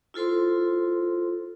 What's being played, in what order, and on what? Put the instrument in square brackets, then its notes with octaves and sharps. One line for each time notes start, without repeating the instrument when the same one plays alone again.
[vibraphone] E4 F4 A4 C5 C6